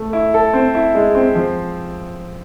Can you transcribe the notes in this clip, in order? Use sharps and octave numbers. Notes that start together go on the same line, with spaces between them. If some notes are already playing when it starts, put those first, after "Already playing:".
Already playing: A3
E4
A4
C4
E4
G#3
C4
F3